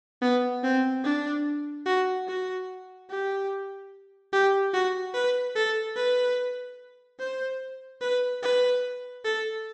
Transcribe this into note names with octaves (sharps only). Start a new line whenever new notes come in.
B3
C4
D4
F#4
F#4
G4
G4
F#4
B4
A4
B4
C5
B4
B4
A4